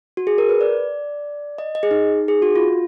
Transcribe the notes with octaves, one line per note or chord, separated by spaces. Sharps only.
F#4
G#4
A#4
B4
D5
D#5
D#5
G#4
D#4
G#4
F#4
F4